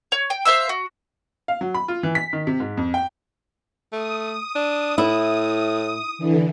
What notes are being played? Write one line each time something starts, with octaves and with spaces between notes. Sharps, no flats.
C#5
G5
C5 E5 F5 E6
F#4
F5
F#3
B5
F4
E3
B6
D#3
C3
G#2
F2
G5
A3 D#6
D4
A2 E4
D3 E3